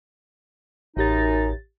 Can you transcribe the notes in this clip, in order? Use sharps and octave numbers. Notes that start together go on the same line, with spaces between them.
A1 F#2 D#4 G4 A6